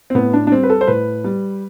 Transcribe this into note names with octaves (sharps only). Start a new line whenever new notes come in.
C4
A2 B3
D4
D4
G3 C4
B4
A4
C5
A2 B4
G3